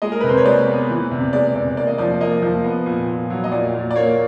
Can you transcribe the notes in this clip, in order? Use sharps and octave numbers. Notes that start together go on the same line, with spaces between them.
G#3 D#5
A#4
C3 B4
C5
C#5
G#3 D5
B3
E3
C3
G#3 D5
C3 D5
A#3 D5
D#5
F3 D5
A#3 D#5
F3
B3
A#2
A#2
F#3
D#5
A#2 D5
A#2
D5
A#3 C#5